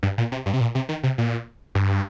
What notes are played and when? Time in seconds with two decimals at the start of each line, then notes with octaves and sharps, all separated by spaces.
0.03 G2
0.18 A#2
0.32 C3
0.46 G2
0.53 C3
0.61 A#2
0.75 C3
0.89 D#3
1.03 C3
1.18 A#2
1.75 G2